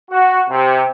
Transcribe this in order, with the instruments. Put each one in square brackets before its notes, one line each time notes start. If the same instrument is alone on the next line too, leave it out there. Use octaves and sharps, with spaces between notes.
[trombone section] F#4
C3